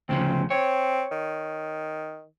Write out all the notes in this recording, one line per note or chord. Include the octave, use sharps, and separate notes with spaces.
D2 C#3 F3 C4
C4 C#5
D#3